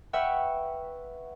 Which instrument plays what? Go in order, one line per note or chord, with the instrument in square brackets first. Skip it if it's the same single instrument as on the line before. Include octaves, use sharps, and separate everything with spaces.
[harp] B4 E5 F#5 G5 C#6 F6